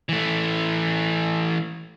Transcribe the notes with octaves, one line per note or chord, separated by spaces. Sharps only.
E3 A3